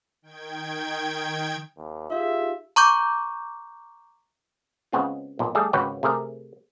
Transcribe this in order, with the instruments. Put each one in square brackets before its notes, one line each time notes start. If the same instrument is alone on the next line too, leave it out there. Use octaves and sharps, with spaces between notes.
[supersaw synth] D#3 G5 G#6
[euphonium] D#2
[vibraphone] D#4 G4 G#4 [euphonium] F4 [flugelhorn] E5
[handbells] A#5 C#6 D6 G6
[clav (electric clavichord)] C#3 G#3 B3 C4 F4
B1 A#2
G3 A3 G#4 A4
G#1 C#2 F#4 B4 C#5 G5
C3 A3 G#4 A#4